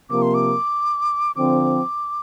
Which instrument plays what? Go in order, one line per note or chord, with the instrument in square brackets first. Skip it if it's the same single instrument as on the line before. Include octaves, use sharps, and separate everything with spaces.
[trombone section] C3 F3 A#3 [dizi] D6
[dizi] C6
D6
[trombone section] D3 F3 C4 [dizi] D6